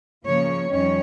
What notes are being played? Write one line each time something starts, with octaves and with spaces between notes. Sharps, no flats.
C#3 F3 A#3 C#5
F2 D#3 G3 C#4 C#5